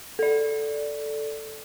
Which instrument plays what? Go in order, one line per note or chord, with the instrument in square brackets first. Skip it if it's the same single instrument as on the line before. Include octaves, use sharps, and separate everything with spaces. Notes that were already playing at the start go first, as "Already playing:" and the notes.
[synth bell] A4 D5